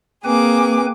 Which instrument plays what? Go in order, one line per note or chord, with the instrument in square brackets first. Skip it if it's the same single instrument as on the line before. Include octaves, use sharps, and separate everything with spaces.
[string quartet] A#3 G#4 D6 [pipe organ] C4 B4 G#5